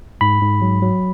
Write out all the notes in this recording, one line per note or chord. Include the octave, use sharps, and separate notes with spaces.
G#2 B5
G#2
F#3
F#3